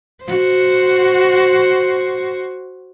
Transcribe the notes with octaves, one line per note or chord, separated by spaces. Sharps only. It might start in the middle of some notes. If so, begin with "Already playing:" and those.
F#4 C5